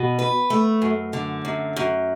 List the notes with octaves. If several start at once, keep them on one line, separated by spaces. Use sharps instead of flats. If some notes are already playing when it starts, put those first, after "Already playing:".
Already playing: B2
B4
A3
F#2
D3
F#2
F#2